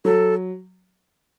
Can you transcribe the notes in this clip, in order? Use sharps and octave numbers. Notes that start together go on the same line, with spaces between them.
F#3 A4